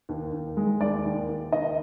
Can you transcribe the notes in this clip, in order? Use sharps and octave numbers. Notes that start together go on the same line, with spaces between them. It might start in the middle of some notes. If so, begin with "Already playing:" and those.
D#2
D#2
G#3
D#2 D5
D#2
D#2
D#2 D#5